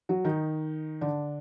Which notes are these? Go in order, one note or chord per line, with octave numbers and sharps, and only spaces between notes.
F#3 F#4
D#3 D#4
D3 D4